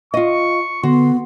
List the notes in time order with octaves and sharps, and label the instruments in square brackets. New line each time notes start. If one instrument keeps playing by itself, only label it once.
[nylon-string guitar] F4 D#5 [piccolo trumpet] C#6
[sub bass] D3 [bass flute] B3 [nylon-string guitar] F#4 [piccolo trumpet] C6